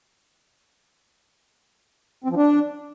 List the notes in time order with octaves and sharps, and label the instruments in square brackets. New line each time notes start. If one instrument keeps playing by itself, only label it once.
[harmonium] C4
F3
D4